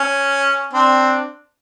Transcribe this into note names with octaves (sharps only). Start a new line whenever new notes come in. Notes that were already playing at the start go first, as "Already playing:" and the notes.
Already playing: C#4
C4 D4